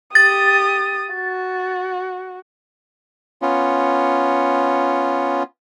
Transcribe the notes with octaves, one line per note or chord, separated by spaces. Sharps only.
G4 D#6 A6
F#4
B3 C#4 F4